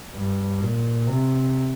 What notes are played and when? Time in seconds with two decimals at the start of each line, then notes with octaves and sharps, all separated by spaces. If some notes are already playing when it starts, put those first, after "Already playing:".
0.14 G2
0.61 A#2
1.07 C3